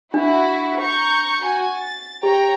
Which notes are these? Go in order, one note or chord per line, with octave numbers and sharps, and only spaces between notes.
D4 E4 F#4
A#5 C#6 G6
F#4 G#5
A6
G4 C#5 G5 A#5